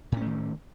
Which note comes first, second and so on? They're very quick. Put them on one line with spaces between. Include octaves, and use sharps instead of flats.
A2 C#4 A3 D#3